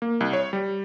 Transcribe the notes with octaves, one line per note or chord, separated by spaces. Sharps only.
A#3
C2
C#5
G3